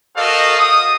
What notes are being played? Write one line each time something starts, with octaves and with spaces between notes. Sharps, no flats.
F#4 A4 A#4 C5 D#5 F5
D#6